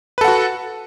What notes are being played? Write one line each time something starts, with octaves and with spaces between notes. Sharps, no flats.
F#4 A4 B4 F#5